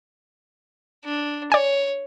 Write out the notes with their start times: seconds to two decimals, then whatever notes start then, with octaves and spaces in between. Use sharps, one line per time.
1.05 D4
1.52 C#5 D5 G#5